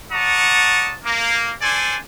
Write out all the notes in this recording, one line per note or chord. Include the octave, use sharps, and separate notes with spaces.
D5 F#5 A5 A#5 C#6 D#6
A#3
D4 A4 C5 D5 G#5